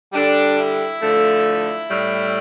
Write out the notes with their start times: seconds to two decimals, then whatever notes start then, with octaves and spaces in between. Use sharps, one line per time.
0.13 D3 G3 D4
0.57 E4
1.00 D3 F3 A3
1.45 E4
1.89 A2 G3